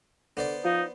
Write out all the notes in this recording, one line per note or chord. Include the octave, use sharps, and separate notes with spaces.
D3 B3 C5 D5
F3 D#4